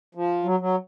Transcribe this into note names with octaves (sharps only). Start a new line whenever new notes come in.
F3
F#3
F#3